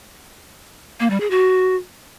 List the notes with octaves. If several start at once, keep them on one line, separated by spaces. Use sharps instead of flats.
A#3
G3
G#4
F#4